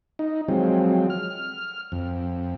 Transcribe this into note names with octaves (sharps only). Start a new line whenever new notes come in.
D#4
F3 F#3 G#3 C4
F6
F2